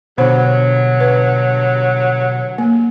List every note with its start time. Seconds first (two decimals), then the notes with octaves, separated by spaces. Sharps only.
0.18 G2 B2 D3 F#3 C5
1.00 B4
2.58 A#3